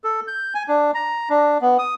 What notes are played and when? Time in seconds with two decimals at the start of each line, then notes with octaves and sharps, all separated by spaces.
0.04 A4
0.28 G6
0.55 G#5
0.68 D4
0.94 A#5
1.30 D4
1.61 B3
1.79 D#6